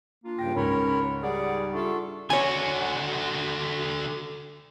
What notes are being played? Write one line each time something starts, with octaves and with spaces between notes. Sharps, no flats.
A#3 D4 F4
G2 C#3 G5 A#6
C#2 G#2 C#4 A#4 C#5 B5
G3 G#4 D5 F#5
D4 F4 A4 E5 C#6
D3 F#4 C#5 G#5